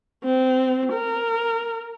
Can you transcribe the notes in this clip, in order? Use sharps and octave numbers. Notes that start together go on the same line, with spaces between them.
C4
A#4